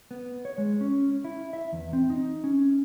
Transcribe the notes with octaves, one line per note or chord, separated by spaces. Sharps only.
B3
C#5
G#3
C#4
E4
E5
E2
C4
D#4
C#4